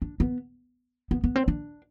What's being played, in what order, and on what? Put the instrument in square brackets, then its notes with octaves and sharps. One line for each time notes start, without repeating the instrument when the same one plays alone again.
[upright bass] D4
B3
B3
B3
C4
D4